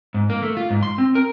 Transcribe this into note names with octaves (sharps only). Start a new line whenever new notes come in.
G#2
A#3
A3
F4
G#2
C6
C4
A#4